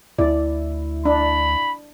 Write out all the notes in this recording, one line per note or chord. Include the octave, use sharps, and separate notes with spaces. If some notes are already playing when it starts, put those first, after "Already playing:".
D2 E4 D5
D4 B5